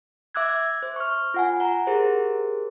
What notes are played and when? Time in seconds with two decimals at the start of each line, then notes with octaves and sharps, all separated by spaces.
0.35 E5 D6 E6 F#6 G#6
0.83 C5
0.96 C#6 F6
1.34 F4 F#5 G#5
1.60 F#5 A#5
1.87 G4 G#4 A#4 C5